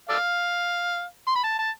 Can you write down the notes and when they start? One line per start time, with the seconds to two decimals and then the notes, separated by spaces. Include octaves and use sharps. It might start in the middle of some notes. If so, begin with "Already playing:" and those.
0.09 A4 D5 F5
1.28 C6
1.36 B5
1.44 A5
1.59 A5